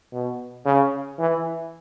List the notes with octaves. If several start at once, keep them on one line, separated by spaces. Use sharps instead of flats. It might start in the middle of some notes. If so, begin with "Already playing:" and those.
B2
C#3
E3